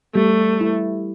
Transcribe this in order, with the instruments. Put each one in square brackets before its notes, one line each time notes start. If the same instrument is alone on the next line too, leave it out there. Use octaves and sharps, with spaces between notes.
[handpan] G3 [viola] A3
[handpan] E4